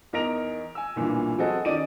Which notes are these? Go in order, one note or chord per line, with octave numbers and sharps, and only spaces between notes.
E2 D#4 A#4 A#6 D7 F7
G#5 E6
B1 G2 A#2 E3
F#3 C4 F#4 G#4 A4 D#5
D#3 C#4 D5 D#5 D7 D#7